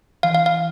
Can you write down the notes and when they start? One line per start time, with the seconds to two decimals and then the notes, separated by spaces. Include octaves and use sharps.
0.23 E3 F5
0.35 F5
0.46 F5